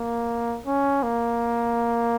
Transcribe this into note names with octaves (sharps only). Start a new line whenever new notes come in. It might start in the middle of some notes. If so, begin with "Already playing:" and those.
Already playing: A#3
C#4
A#3